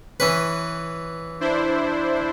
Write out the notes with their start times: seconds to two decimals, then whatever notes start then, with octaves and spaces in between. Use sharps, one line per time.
0.20 E3 C#4 B4
1.41 D4 E4 C5